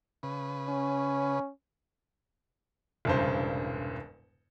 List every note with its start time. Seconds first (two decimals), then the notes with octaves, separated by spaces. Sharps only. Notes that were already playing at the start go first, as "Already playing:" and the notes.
0.23 C#3 B4
0.68 C#4
3.05 E1 C2 G2 C#3 C5